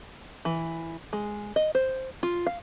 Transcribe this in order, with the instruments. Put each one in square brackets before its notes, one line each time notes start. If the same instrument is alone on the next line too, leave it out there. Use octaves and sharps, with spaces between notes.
[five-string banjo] E3
G#3
D#5
C5
F4
F5